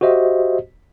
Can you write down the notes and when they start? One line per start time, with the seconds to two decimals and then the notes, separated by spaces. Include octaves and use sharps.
0.01 F#4 G4 C5 D#5 E5